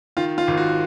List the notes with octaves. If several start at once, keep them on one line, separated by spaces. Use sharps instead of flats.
D#3 F4
F4
G#1
F#4